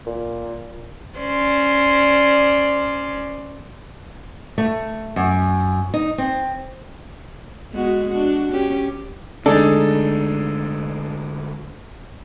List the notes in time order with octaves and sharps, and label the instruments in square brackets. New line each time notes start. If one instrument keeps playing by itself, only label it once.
[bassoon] A#2
[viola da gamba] C#4 C5 D5
[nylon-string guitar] A3
F#2
D#4
C4
[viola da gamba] G#3 B3 F#4
D4 F#4
C#4 G4
[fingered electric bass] D3 G#3 A3 [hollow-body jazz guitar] D4 [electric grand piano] D#4 G#4 A4